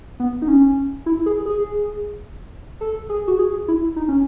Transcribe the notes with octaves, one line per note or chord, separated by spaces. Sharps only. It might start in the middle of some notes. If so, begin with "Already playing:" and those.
B3
D#4
C#4
E4
G#4
G#4
A4
G#4
F#4
G#4
E4
D#4
C#4